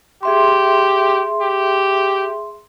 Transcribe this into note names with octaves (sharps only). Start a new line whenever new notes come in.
G4 G#4 E5 C6
G4